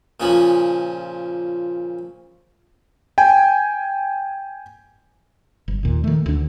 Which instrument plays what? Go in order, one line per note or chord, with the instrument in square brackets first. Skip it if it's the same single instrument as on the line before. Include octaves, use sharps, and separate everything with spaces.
[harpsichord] A#2 C#3 F3
[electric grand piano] G5 G#5
[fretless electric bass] G1
D#2 A#2
D#3 A3
D2 D4